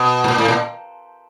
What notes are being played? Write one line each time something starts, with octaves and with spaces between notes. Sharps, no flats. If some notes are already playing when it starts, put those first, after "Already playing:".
Already playing: B2
A2
A#2
A2
A#2